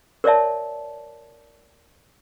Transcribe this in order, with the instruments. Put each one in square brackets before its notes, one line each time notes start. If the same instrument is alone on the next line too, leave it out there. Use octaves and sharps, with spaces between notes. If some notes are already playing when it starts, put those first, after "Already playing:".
[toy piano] A#4 C#5 D5 E5 A5